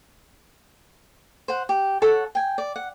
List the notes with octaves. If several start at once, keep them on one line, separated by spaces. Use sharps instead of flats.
C5 F#5
G4
A4 C#5 F#5
G5 G#5
D5
F#5